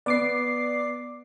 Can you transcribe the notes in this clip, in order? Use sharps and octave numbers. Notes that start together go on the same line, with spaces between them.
B3 D5 D6 C7